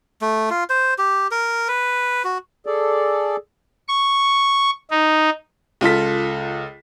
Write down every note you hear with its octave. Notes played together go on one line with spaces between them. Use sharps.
A3
F4
C5
G4
A#4
B4
F#4
G#4 A4 D5
C#6
D#4
C#2 F4 A4 B6